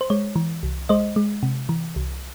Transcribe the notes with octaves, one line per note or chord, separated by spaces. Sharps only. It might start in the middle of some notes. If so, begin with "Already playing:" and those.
C5
G#3 C#5
E3
C2
G#3 C5 D#5
G#3
C3
E3
C2